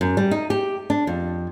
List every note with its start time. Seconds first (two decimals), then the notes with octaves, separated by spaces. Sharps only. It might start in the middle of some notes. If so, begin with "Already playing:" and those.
0.01 F#2
0.17 G3
0.31 D#4
0.50 G4
0.90 D4
1.07 F2